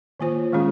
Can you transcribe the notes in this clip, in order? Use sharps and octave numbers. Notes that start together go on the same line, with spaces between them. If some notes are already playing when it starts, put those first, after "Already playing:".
D#3 A#3 F4 C5
D#3 G#3 C#4 F4 G#4